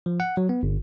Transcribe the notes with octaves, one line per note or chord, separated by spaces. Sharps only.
F3
F#5
F#3
B3
G1